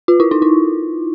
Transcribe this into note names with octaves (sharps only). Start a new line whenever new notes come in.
F4
E4
D#4
E4